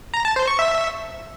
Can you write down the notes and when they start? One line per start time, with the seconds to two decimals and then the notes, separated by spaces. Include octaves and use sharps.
0.14 A#5
0.25 A5
0.36 C5
0.48 C#6
0.59 E5